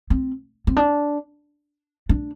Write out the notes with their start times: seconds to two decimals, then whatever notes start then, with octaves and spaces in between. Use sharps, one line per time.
0.10 C4
0.67 C4
0.77 D4
2.09 D4